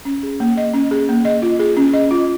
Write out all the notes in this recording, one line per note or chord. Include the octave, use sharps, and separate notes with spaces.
C#4
G#4
A#3
D#5
C#4
G#4
A#3
D#5
F4
G#4
C#4
D#5
F4